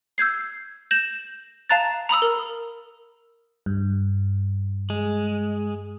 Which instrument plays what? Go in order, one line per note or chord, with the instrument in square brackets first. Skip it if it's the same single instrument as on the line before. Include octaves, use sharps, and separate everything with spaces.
[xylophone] E6 G6 G#6 C7
G6 A#6 E7 F#7
F5 A5 A#5 F#6 A6
A#5 B5 D#6 E6
A#4
[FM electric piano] G2
[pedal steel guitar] G#3